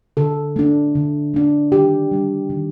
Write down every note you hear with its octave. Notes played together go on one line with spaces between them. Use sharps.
D3 A4
A3 D4
D3
A3 D4
D#3 G4
G3 D4
D#3